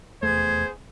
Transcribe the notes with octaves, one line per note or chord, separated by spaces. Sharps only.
F1 E2 A3 B3 G#4 C5 G#6